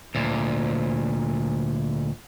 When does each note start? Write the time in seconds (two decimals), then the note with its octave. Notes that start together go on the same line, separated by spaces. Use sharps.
0.15 D2 A#2